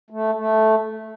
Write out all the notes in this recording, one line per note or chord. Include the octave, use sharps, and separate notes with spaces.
A3
A3